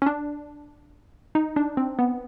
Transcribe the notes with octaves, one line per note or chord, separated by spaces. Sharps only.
C#4
D4
D#4
D4
C4
B3